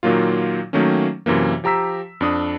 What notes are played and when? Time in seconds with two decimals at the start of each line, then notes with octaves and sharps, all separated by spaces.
0.03 A#2 D#3 F#3 A#3 F4
0.73 D#3 F#3 A3 A#3 C#4
1.26 F#2 C3 E3 A#3
1.64 F3 G4 A#5 E6 B6
2.21 F2 D4 D#6